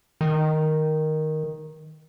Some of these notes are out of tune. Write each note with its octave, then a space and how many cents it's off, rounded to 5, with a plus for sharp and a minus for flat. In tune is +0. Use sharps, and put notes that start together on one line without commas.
D#3 +0